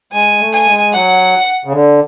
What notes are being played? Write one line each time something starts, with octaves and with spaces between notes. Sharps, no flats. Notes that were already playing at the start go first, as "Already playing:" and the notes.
G#3 G#5
A3
G#5
G#3
F#3 F#5
C#3
D3